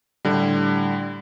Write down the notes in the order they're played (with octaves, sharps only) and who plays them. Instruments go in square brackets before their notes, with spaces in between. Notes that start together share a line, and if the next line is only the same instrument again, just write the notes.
[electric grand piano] A2 D3 G3